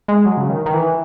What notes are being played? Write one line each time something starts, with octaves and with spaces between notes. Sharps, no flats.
G#3
F#3
C#3
D#3
D#3
E3